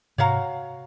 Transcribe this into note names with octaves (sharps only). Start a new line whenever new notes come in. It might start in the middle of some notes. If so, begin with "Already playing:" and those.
G#2 C3 F#4 C#5 F5 A#5